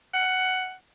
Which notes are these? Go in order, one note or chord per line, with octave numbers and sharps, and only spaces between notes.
F#5